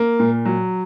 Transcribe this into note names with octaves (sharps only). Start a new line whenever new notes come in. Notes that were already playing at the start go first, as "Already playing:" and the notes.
Already playing: A#3
A#2
F#3